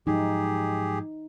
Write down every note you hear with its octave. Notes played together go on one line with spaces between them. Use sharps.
G#2 F3 F#3 D#4 G4 G#4